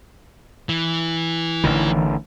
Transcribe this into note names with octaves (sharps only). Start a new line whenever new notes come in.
E3
A1 D3 D#3